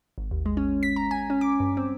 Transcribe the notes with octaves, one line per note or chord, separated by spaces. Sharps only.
G#1
D#2
G#3
C#4
B6
A#5
G#5
C#4
D6
G2
C4